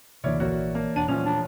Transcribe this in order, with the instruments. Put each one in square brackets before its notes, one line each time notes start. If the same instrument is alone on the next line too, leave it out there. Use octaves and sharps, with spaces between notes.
[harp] D2 E3 F6 [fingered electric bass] C3 A#3 [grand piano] E4 C#5 D5
[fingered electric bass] A#1 [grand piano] A#3 F#4 [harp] C#5 D5 E5
[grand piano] A#3 [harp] A5
[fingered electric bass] E1 [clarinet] D4 [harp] C#5 F#5 [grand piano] D#7
[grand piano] D#1 F3 F7 [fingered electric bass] A#2 [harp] G3 A3 [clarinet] C#4
[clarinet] D4